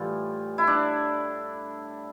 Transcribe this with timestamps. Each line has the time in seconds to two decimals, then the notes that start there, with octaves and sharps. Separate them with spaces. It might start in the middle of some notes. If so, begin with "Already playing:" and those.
Already playing: A2 E3 G3 F4
0.58 E4
0.67 D4